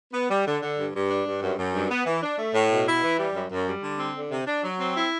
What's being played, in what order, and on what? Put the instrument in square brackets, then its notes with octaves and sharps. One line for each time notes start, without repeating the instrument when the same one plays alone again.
[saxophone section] B3
G3
D3
D3
G2
G2
D4
G2
F#2
F#2
G2
B3
E3
D4
A3
A2
B2
E4
E3
G3
F#2
F#2
G3
D3
C4
D3
C3
D4
F#3
C4
E4